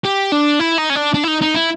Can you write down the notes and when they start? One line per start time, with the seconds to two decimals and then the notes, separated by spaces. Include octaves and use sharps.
0.04 G4
0.32 D4
0.60 E4
0.78 D#4
0.90 C#4
0.95 D4
1.14 D4
1.24 E4
1.28 D#4
1.42 D#4
1.55 E4